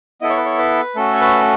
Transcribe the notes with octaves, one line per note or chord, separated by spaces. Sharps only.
B3 E4 A4 D#5
C#5
B4
C#5
B4
A3 C#4 F#4 A4
C#5
B4